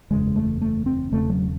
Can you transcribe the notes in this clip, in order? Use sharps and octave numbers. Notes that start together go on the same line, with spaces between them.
F#1 E2 C#3 G#3
A3
A3
C4
E1 E2 C#3 A3
F#3